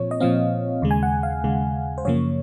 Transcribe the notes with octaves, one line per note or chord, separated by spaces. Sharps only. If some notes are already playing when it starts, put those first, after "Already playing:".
Already playing: A#2 F3 C4 C#5
D#5
A#2 F3 C4 F5
D#2 C#3 G#3
G#5
F#5
F5
D#2 C#3 G#3
C5
F#2 C#3 F3 A#3 C#5